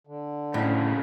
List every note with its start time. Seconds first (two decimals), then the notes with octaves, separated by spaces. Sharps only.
0.07 D3
0.54 F2 A2 C#3